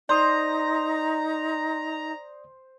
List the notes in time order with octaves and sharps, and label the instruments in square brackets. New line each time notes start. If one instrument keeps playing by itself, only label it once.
[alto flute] D#4 [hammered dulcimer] C5 [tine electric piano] D5 C6 D#6 [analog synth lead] A#5